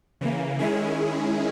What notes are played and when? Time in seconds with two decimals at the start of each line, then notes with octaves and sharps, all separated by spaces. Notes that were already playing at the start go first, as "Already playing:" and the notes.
0.21 C#3 E3 A#3
0.59 D#3 G#3 C#4 E4 G#4